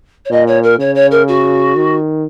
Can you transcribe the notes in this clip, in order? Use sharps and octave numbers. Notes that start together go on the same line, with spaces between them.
C#5
A#2 D#5
C#5
A#4
C#3 C#5
C#5
A#4
F#4
D#3